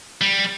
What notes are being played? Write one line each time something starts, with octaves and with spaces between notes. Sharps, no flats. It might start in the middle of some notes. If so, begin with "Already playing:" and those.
G3